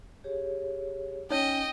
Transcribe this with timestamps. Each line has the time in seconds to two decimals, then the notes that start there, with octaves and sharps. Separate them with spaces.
0.24 G4 G#4 C#5
1.30 C#4 D#4 C#5 D#5 G5